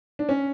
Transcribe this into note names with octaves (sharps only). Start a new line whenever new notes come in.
D4
C#4